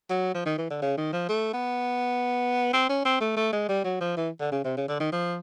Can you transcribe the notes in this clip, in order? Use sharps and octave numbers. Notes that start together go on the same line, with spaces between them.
F#3
F3
D#3
E3
D3
C#3
D#3
F3
A3
B3
C4
C#4
C4
A3
A3
G#3
G3
F#3
F3
E3
D3
C#3
C3
C#3
D3
D#3
F3